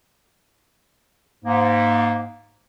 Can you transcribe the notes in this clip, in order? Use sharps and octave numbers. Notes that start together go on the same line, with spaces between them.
G#2 A#3